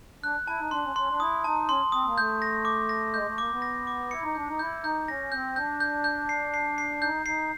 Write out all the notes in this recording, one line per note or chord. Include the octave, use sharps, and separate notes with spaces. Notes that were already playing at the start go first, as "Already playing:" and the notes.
D4 F#6
E4 A5
D#4
D4 C6
C#4
C#4 C6
D4
E4 D#6
D#4 A5
C#4 C6
C4 D#6
A#3
A3 G6
A#6
D6
A#6
G#3 G6
A3
A#3 D6
B3
A#6
D6
E4 C#7
D#4
D4 G6
D#4
E4 G6
D#4 G6
C#4 A#6
C4 G6
D4 G6
G6
G6
C7
C7
C7
D#4 G6
D#4 C7